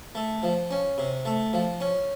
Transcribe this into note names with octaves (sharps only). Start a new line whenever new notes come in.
A3
F3
C#4
C3
A3
F3
C#4